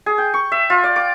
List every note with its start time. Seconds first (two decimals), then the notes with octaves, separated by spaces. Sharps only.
0.06 G#4
0.18 G5
0.34 C#6
0.52 E5
0.70 F4
0.84 D5
0.96 D6